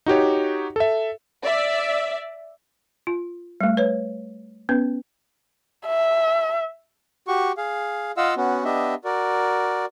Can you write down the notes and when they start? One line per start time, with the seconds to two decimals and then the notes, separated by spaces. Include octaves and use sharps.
0.06 D#4 F#4 G4 C#5
0.76 A4 E5
1.44 D5 E5
3.07 F4
3.61 G3 A3
3.77 B4 C#5
4.69 B3 C#4 B4
5.86 E5
7.28 F#4 G4 C#6
7.57 G#4 F5
8.17 F4 D#5 F5 F#5 E6
8.37 B3 C#4 F#4
8.65 B3 D4 G4 D#5 E5
9.05 F#4 A#4 D5